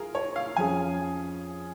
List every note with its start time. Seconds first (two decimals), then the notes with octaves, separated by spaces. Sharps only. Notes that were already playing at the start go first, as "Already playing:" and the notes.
Already playing: F4 G#4 A#4
0.15 C#5
0.36 F5
0.56 F2 F3 C#4 G#4 G#5